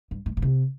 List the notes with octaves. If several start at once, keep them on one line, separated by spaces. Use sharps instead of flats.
G2
G#2
A#2
C3